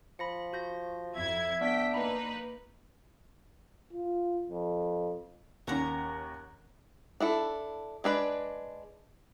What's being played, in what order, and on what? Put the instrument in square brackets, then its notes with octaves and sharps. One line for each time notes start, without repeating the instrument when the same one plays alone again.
[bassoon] F3 [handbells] B5 A#6 C#7
[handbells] F#4 G6 A#6
[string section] F2 E4 G#6 [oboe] E5
[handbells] B3 [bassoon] D4 [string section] G5 B6
[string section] A#3 D#4 B4 [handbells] A#5 B5
[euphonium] F4
F2
[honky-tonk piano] D#2 C#4 [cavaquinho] A#4 F#5 A#5
[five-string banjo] D4 E4 A4
G#3 D4 B4 D5